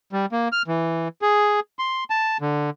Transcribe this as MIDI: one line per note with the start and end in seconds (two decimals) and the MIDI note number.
0.13 0.26 55
0.32 0.48 58
0.52 0.62 89
0.68 1.08 52
1.22 1.60 68
1.79 2.04 84
2.10 2.37 81
2.41 2.70 50